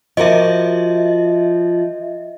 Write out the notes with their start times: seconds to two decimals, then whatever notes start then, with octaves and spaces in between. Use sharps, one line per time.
0.17 F3 F#4 A#4 D#5 E5